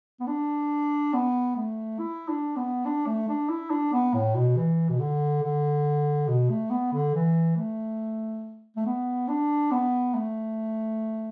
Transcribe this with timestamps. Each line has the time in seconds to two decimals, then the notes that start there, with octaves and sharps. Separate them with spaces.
0.20 B3
0.27 D4
1.14 B3
1.56 A3
1.99 E4
2.28 D4
2.57 B3
2.85 D4
3.07 A3
3.29 D4
3.49 E4
3.70 D4
3.93 B3
4.14 A2
4.35 B2
4.56 E3
4.89 B2
5.00 D3
5.43 D3
6.28 B2
6.50 A3
6.71 B3
6.93 D3
7.15 E3
7.57 A3
8.77 A3
8.86 B3
9.28 D4
9.71 B3
10.15 A3